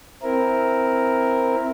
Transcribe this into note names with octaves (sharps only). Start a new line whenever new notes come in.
C4 E4 A#4